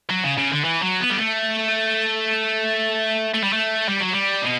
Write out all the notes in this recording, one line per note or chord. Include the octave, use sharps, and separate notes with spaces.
F#3
C#3
C#3
D3
E3
F#3
B3
G3
A3
A3
G3
A3
G3
F#3
G3
B2